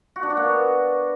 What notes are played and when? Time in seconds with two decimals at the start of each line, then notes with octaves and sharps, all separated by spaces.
0.16 F#4
0.23 D4
0.30 F#4
0.37 A#3
0.44 B3